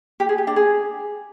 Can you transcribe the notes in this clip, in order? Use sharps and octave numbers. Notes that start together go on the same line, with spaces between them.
G4
G#4
G4
D4
G#4